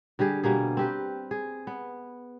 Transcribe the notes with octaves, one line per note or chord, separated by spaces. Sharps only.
D3 G3 G4 G#4
B2 G3 A#3 G#4
C4 G4 B4
G#4
B3